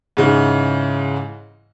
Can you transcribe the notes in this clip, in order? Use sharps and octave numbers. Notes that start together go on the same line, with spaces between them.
G#2 C#3 E3